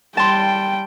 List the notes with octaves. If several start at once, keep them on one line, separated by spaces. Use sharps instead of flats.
G3 G5 A5 C6